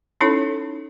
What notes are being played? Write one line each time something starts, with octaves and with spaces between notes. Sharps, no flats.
C#4 D#4 E4 A4 C#5